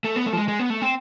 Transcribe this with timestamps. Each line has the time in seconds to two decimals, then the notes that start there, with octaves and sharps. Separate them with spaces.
0.04 A3
0.16 B3
0.26 A3
0.33 F3
0.37 G#3
0.48 G#3
0.59 B3
0.70 A3
0.82 C4